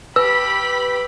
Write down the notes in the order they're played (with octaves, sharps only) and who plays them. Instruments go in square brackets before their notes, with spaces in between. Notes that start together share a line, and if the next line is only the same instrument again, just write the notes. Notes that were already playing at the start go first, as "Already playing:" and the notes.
[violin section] G4 B5 B6 [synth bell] B4 [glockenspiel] E6